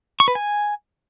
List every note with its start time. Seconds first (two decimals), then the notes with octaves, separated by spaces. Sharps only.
0.20 C#6
0.28 B4
0.35 G#5